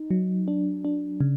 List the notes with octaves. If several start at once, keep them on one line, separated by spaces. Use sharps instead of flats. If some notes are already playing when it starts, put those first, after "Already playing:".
Already playing: D#4
F#3
D4
D4
C#3